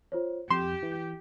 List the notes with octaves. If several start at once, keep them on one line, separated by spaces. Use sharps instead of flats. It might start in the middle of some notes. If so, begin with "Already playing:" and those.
F4 C5 C#5
F2 G4 C6 E7
E3